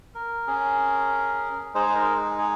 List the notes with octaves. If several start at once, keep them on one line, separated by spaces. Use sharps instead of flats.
A#4
C#4 G#4
G#3 D#4 G#4 C5
A#4
G#4
G#4